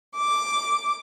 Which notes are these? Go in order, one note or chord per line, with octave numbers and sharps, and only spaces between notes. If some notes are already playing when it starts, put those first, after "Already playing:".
D6